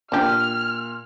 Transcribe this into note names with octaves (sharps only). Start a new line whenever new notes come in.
A#2 D4 G4 F6